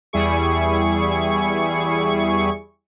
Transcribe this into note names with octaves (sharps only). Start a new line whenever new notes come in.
E2 G3 E4 G#4 C#6